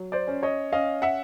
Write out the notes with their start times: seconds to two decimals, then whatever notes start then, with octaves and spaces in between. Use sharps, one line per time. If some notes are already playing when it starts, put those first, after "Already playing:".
Already playing: F#3
0.12 C5 D5
0.28 C#4
0.43 C#5 D#5
0.72 C#4 D#5 F5
1.02 E5 F#5